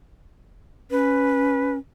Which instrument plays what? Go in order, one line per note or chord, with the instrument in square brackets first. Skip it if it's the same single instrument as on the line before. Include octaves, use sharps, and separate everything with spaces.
[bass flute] C#4 [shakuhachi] B4